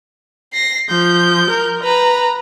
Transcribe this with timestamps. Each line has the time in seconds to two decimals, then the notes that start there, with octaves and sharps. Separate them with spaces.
0.54 A#6 C7
0.90 F3 G6
1.50 A#4
1.84 B4 A#5